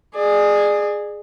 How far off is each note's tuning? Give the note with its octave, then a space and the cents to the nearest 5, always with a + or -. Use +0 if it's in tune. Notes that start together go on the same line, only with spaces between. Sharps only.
G#4 +0 D5 +35